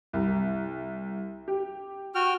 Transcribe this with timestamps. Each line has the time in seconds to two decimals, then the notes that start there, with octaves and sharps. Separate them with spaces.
0.13 C2
1.48 G4
2.15 F#4 G5 F6